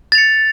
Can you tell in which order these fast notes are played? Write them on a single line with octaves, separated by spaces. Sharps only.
A6 F7 C#7